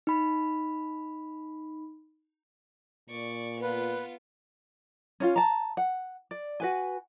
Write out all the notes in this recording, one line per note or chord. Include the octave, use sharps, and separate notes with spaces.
D#4 B5
A#2 D5 C#6
B3 F4 B4
C#4 E4 F4
A5 A#5
F#5
D5
F#4 B4 G#5